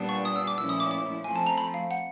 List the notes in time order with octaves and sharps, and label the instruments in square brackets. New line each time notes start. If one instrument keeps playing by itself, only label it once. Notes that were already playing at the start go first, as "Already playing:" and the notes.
Already playing: [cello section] A#2 G3 B3 D4
[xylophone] C#6
D#6
E6
D6
[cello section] A#2 F3 A3 C#4 E4 [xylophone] E6
[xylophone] D#6
D6
D6
[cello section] F3 A3 C4 [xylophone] G#5
[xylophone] A5
A#5
B5
F5
F#5